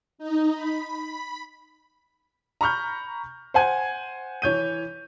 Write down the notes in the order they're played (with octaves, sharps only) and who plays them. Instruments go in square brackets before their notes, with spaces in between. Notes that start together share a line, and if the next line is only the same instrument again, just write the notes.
[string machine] D#4
B5
[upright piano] A#5 B5 C#6 F6 G6
C5 F#5 G#5 G#6
E3 C#5 G6 D#7